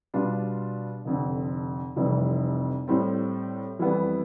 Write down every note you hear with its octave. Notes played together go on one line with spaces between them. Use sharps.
B2 G3 D4 F4
F1 F2 D3
F1 F2 C3 E3 G3
A2 G3 C4
F2 E3 G3 B3